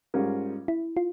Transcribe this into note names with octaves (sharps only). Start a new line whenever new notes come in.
G#2 G3 C#4 F4 A#4
E4
F4